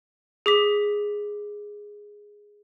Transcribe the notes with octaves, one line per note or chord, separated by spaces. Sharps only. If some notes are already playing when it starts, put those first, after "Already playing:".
G#4 D6 B6